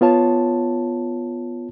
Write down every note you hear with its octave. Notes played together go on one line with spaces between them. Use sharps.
B3 F4 C#5 A5